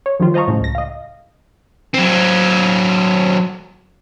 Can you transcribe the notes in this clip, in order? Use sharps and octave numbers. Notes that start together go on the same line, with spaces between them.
C#5
D#3 F3 G3 F4
C5 D#5 F5 A5 A#5 C#6
A2 C#3
C#2 A#6
D#5 F5
F#3 C4